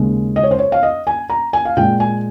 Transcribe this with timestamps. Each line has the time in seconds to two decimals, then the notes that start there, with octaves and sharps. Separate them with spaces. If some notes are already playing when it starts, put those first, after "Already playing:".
Already playing: D#2 C#3 G#3
0.36 D#5
0.43 C#5
0.51 C5
0.59 C#5
0.72 F5
0.83 D#5
1.07 G#5
1.30 A#5
1.53 G#5
1.65 F5
1.77 A#2 G#3 G5
2.00 G#5